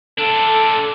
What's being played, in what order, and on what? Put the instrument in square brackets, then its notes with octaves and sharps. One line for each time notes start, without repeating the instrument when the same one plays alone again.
[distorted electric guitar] D4 F4 [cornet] A4